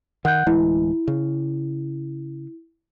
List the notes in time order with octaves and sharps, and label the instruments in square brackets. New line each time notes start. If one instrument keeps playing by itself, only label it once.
[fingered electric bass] D#3 [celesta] F#5 F#6 G6
[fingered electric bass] D1 E3 G#3 [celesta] E4
[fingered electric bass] C#3